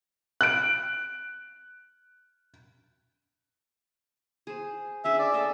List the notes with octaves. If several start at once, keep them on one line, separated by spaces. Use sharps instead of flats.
F#6 D7
G#4 C5
C#4 D4 G#4 E5
D5
A4 D#5 E5